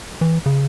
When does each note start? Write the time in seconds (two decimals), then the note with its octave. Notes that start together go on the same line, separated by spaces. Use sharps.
0.21 E3
0.46 C#3